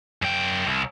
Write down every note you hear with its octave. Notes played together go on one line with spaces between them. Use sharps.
F#2 G5
C2